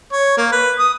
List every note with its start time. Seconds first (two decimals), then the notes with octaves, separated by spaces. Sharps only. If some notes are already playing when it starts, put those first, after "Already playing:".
0.12 C#5
0.37 A#3
0.52 B4
0.79 D#6